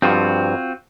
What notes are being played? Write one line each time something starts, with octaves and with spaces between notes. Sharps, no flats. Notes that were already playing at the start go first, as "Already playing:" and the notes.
G2 F3 C4 F4 F#4